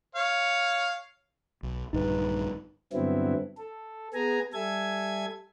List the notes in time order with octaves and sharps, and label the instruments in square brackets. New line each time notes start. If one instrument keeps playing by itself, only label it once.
[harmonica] C#5 F5
[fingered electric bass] B1
[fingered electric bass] A#1 G2 D3 [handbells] D#4 B4
[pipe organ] G2 D3 F#3 B3 C4 E4
A4
B3 G#4 G#5 A#5
G3 A4 E5 G#5 G#6